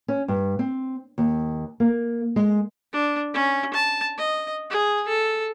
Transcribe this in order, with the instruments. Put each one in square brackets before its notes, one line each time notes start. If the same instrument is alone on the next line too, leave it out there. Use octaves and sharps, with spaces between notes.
[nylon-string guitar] C#4
G2
C4
D#2
A#3
G#3
[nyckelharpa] D4
C#4
A5
D#5
G#4
A4